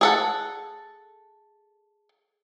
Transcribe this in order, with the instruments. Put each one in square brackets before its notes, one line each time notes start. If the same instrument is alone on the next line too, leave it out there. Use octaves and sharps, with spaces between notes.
[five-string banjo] G#4 A4 F#5